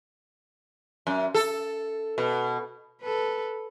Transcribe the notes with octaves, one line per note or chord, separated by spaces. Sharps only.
F#2
A4
B2
A4 B4